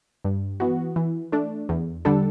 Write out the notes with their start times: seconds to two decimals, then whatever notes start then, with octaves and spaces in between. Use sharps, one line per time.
0.25 G2
0.60 E3 B3 F#4
0.96 E3
1.32 A3 D4
1.69 E2
2.05 D3 G3 D4 A4